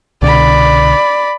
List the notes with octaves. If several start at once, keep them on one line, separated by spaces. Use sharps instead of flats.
C2 B2 D3 D5 B5